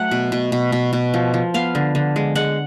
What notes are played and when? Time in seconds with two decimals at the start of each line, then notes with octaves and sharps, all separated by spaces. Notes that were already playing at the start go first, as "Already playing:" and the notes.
Already playing: F#3 A3 F#5
0.11 B2
0.32 B2
0.52 B2
0.72 B2
0.93 B2
1.14 F3
1.34 F3
1.54 B3 F5
1.75 D3
1.95 D3
2.16 G#3
2.35 G#3 F#5